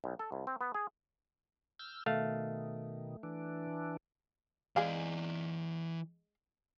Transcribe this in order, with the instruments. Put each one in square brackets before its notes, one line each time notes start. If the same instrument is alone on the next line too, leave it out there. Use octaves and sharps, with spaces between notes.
[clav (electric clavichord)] B1
A4
C2
C4
B3
G#4
[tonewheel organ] E6 F6 G6
[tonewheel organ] B2 D#3 [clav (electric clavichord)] A3 F5
[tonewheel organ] E3 D4
[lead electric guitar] E3 D5 [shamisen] G#3 G#4 F5